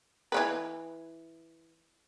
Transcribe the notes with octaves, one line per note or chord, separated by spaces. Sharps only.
E3 A#3 B4